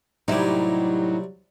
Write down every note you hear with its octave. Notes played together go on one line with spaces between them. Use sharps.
A2 C3 F#3 G3 D#4 E4 G4